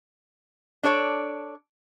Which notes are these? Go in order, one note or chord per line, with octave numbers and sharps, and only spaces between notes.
D4 A4 C#5 D5